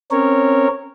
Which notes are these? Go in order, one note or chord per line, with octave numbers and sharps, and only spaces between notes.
C4 C#4 A#4 C#5